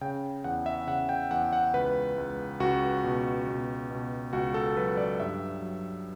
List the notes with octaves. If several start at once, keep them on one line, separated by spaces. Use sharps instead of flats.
C#3 G5
E2 F#5
E5
C#3 F#5
G5
E2 F#5
F#5
C#2 B4
C#2
C#2 F#4
B2
B2
B2
C#2 F#4
A4
F#3 B4
D5
G2 E5
F#3